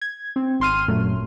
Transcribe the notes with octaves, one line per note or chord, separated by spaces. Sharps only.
G#6
C4
G#1 C6 F6 D#7
F#2 A#2 F#3 A3